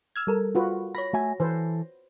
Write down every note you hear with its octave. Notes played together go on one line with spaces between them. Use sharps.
E6 F6 G#6
G3 A4 A#4
F4 F#4 B4
C#5 B5 A#6
A3 F#4 E5 G#5
E3 A4 B4 C5